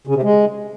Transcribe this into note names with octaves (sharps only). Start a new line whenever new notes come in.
C#3
C3
G#3